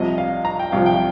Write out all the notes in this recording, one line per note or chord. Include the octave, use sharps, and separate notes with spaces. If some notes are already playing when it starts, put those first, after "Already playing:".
Already playing: C2 C3 F3 D#5
F5
A#5
G5
C2 C3 F3 F5
G5